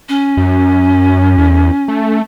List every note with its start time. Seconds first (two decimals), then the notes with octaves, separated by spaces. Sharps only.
0.08 C#4
0.37 F#2
1.38 E2
1.88 A3